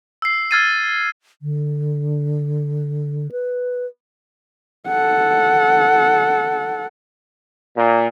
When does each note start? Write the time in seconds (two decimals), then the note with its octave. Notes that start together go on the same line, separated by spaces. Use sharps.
0.22 E6 C7
0.51 E6 F6 G#6 A6 C7 D#7
1.42 D3
3.32 B4
4.88 A4 F#5
7.76 A#2